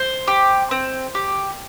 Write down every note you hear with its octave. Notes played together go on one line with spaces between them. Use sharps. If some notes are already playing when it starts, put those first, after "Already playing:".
Already playing: C5
G4
C4
G4